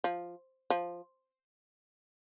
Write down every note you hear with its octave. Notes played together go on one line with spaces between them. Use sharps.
F3
F3